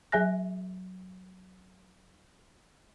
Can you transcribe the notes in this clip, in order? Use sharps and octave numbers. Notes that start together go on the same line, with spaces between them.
F#3 G#4 E5 G#5 F#6 A#6